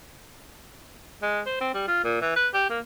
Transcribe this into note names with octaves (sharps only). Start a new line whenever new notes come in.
G#3
C5
C4
G3
F4
A#2
E3
B4
G4
A#3